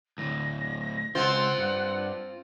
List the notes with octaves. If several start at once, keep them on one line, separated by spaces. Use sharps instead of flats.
D2 A2 A#6
C#2 C4 F4 C5 F#5
G2